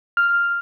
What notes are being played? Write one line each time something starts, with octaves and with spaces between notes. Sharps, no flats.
F6